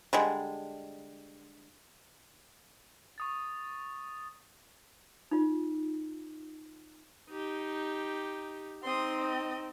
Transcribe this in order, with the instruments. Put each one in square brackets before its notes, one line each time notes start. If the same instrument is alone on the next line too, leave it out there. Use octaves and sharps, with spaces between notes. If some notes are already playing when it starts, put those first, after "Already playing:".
[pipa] D3 G3 G#3
[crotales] C#6 D#6 A6
[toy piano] D#4 F4
[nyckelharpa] D#4 G4
[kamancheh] C4 D#4 [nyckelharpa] C6 D#6
[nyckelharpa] D#5